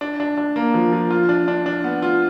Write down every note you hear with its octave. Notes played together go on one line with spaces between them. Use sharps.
D4
D4
D4
A#3
F3
F3
F4
D4
D4
D4
B3
F4